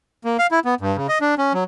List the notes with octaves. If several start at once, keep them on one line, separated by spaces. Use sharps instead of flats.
A#3
F5
E4
B3
G2
C#3
D#5
D4
C#4
F#3